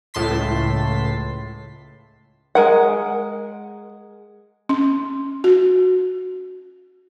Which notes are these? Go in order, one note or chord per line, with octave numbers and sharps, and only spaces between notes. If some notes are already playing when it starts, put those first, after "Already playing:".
C#2 A2 A5 C6 B6
G#3 A#4 F#5
C#4
F#4